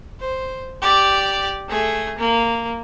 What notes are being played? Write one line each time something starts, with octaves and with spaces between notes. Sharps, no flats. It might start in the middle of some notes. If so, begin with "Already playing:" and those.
C5
G4 D5
A3 G#4
A#3